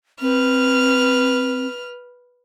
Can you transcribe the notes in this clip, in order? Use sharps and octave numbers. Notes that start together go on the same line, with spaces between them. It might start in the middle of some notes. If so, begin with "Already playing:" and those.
C4 B4 F6